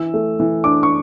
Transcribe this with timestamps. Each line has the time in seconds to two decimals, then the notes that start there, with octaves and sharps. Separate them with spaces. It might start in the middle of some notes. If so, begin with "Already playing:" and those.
Already playing: E3 E6
0.14 A3
0.40 E3
0.64 D4 D6
0.83 C#6